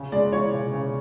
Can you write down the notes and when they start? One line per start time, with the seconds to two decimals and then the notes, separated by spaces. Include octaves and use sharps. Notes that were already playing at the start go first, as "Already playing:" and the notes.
Already playing: C#3
0.12 G#3 D5
0.33 E3 C#5
0.53 C#3
0.73 C#3